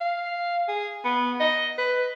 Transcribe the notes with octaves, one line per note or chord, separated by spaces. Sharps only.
F5
G#4
B3
D#5
B4